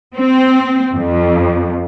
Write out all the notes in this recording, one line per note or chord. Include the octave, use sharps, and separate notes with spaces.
C4
F2